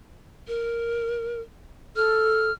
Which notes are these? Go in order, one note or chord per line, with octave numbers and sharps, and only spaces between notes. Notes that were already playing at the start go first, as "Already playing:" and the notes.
A#4
A4 F6